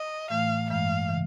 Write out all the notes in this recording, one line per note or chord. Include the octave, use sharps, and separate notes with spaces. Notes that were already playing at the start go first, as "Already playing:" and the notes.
Already playing: D#5
A2 E3 A3 F5
G2 E3 G#3 F5
C#3 E3